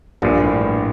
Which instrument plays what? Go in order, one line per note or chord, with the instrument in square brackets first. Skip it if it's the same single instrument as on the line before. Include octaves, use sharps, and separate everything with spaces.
[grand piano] A#1 [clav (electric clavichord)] G2 A#2
[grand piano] A2